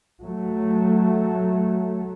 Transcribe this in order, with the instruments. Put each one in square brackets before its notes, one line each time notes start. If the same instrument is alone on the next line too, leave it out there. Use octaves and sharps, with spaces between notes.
[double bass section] F#3 A3